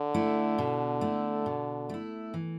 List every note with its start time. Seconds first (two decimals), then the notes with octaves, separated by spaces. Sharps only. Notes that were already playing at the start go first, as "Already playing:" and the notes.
Already playing: D3
0.14 A3 E4
0.58 B2
1.01 A3 E4
1.46 B2
1.89 A3 E4
2.34 E3